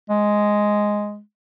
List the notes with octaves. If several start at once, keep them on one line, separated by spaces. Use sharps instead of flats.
G#3